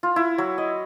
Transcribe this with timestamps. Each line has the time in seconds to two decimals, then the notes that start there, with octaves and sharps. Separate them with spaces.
0.03 F4
0.16 E4
0.38 F#3
0.58 D#5